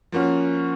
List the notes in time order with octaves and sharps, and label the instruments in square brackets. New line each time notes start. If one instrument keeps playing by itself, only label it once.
[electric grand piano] F3 A#3 C#4 F#4